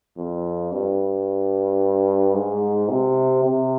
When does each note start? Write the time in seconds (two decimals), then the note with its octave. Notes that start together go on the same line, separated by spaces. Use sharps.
0.17 F2
0.72 G2
2.35 G#2
2.89 C3
3.44 C3